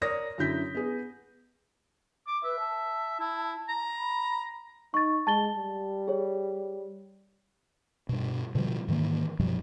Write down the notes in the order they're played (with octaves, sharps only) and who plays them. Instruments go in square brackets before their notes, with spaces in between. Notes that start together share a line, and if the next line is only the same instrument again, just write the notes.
[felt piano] A#4 C#5 D5 D#6 A#6
F#2 D3 E4 G6 B6
B3 G#4
[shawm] D6
[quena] B4 [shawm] E5
[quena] A5
[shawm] E4
A#5
[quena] B5
[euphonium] D#4 [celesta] C#6 A6
[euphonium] G#3 [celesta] A5 A6 G7
[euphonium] G3
[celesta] G#4 C#5
[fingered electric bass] G2 B2
B2 D3 F3 G3
G#2 D#3 E3 A#3
F#2 B2 F3 G3